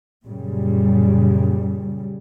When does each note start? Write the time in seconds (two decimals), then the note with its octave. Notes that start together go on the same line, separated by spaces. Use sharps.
0.25 F#2 A#2 C#3 G3